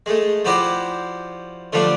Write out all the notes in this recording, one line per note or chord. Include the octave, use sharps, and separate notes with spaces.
G#3 A3
F3 E4 F#4 G4 C5 D5
D3 F3 G3 A3 D4